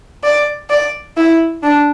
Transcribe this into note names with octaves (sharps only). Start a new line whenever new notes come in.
D5
D5
E4
D4